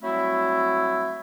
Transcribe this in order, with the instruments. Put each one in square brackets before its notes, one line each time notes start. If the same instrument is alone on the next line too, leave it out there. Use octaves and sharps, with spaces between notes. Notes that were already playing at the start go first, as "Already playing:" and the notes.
[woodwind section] F#3 G3 A3 C4 E4